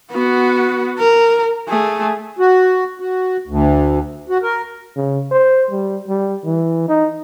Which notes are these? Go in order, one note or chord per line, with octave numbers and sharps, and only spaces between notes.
B3 F#4
A#4
A3 G#4
F#4
F#4
D2
F#4
A#4
C#3
C5
G3
G3
E3
D#4